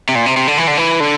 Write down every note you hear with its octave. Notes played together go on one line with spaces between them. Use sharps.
C3
A#2
C3
C3
D3
E3
D3
E3
D3